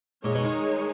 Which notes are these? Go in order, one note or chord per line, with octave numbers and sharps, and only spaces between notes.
A#2 G#3 D#4 G#4 C#5
B2
D#3